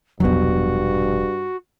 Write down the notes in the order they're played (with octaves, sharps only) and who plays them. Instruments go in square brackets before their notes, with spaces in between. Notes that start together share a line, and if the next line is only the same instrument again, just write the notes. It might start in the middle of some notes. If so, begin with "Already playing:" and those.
[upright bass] E1 A#1 [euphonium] G2 [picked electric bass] F#3 B3 [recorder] F#4